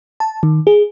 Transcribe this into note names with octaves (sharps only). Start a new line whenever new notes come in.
A5
D#3
G#4